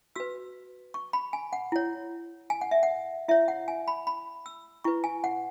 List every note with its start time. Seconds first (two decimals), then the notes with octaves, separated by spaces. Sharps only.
0.16 F#4 B4 E6
0.94 C#6
1.13 B5
1.33 G#5
1.53 F#5
1.72 E4 C#5
2.50 G#5
2.61 F#5
2.71 E5
2.83 F#5
3.28 E4 C#5 E5
3.48 F#5
3.68 G#5
3.88 B5
4.07 B5
4.46 E6
4.84 E4 B4 C#6
5.04 G#5
5.24 F#5